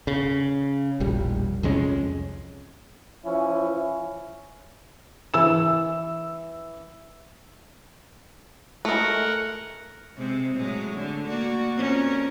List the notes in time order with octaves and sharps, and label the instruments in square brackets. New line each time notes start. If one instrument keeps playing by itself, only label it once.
[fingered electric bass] C#3
E1 A#1 G3
C2 F2 G#3 C#4
[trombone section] E3 F3 C#4 E4
[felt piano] E3 E6 E7
[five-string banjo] G#3 A3 [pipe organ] A#4 F#5
[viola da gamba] C3 G#3 C4
A2 F#3 G#3
D3
A#3 F#4 D5
F2 C#4 A#4